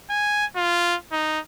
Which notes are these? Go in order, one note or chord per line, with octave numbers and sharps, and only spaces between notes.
G#5
F4
D#4